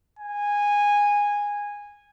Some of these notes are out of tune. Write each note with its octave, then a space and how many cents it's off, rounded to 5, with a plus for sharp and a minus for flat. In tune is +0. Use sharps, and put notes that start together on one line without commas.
G#5 -15